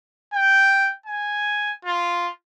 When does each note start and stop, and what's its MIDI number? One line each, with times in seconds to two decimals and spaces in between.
0.34 0.92 79
1.06 1.72 80
1.85 2.30 65